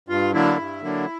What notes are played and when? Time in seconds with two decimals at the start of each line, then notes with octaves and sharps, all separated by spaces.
0.09 G2 F4
0.33 D3 F#3 A#3 D4 E4
0.58 G2
0.81 D3 F#3 A#3 D4